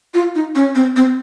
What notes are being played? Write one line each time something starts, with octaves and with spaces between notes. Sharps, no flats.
F4
D#4
C#4
C4
C4